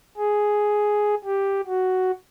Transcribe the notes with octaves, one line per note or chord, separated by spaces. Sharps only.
G#4
G4
F#4